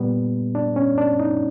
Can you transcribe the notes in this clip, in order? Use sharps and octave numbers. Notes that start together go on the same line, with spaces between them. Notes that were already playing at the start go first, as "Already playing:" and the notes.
Already playing: A#2 G3 B3
D4
C#4
D4
D#4